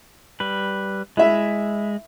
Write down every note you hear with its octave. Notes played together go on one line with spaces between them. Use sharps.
G3 B4
G#3 E4 E5